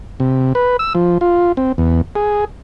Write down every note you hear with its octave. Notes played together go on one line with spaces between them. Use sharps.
C3
B4
E6
F3
F4
C4
E2
G#4